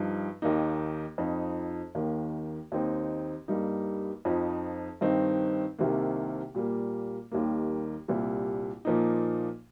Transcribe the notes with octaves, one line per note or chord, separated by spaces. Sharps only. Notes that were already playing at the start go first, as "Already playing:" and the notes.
Already playing: G2 F3 D#4
D#2 D#3 A#3 D#4
F2 F3 D#4
D#2 D#3 A#3
D#2 D#3 C4 D#4
G2 G3 A#3 D#4
F2 F3 D#4
G2 D#3 C4 D#4
C2 C3 D#3 A#3
A#2 G3 A#3
D#2 D#3 G3 A#3
C2 A#2 G3
A#2 F3 A#3 D#4